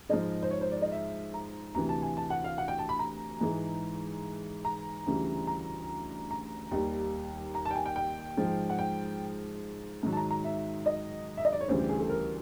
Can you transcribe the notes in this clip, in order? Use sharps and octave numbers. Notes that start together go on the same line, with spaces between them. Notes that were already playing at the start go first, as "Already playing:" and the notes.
G#2 F3 G#3 D#5
C5
C#5
C5
D5
D#5
E5
A#5
D2 C3 E3 A#5
A5
G#5
A5
F#5
F5
F#5
G5
A5
B5
A#5
G#2 E3 G#3
A#5
D2 C#3 E3 G3
A#5
A#5
D#2 D#3 G3
A#5
A5
G5
G#5
G5
G5
G#2 F3 G#3
F#5
G5
G#2 D#3 F#3
A5
A#5
A#5
E5
D#5
E5
D#5
D5
C#5
D2 C#3 E3 G3 C5
G4
G#4
A4
A#4